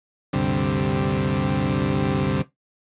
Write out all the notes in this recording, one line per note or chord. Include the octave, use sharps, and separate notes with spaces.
D2 G2 C3